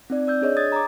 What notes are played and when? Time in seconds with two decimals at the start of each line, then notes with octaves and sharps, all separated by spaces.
0.10 C4 D#4 D5
0.27 D5 E6 G6
0.42 D4 G#4 C#5 D#5
0.57 D#6 G#6 A6
0.72 A#5 D6